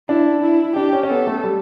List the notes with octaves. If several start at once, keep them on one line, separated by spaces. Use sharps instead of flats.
D4 E4
E4
D4 G4
C#4
C#4
B3 A4
A3
G3